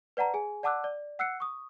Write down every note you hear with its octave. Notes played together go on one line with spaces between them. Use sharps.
B4 D5 F#5 A5 A#5
G#4 G#5
D5 F#5 A5 D6 E6 F#6
D5
F#5 E6 F#6 C7 C#7
C#6 D#6